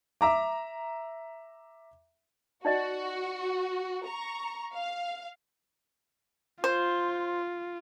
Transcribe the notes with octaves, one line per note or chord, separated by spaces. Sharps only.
E5 A#5 D6
D#4 F#4 D5 D#5
A#5 C#6
F5
F4 C5